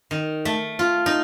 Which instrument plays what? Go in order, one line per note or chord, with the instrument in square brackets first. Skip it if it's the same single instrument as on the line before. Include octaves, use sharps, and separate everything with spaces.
[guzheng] D#3
A3
F4
D#4